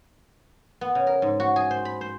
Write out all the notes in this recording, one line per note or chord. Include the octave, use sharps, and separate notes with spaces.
B3
C#3
A#4
G#2
F#4
G#4
C5
B5
C5